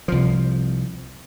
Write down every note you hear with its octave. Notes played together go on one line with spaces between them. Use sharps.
C2 F3